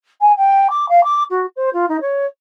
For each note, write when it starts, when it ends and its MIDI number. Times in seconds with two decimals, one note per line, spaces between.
0.21 0.32 80
0.37 0.68 79
0.70 0.86 86
0.89 1.04 77
1.04 1.23 86
1.30 1.46 66
1.56 1.70 72
1.73 1.86 65
1.89 2.00 63
2.01 2.26 73